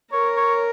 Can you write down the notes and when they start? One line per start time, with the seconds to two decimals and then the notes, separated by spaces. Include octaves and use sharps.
0.12 A#4 C#5
0.37 C#5